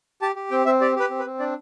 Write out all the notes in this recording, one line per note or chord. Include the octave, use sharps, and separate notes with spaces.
G4 A5
G4
C4 G5
C4 E5
G4 D5
G4 B4
C4
B4
C4
D4 D5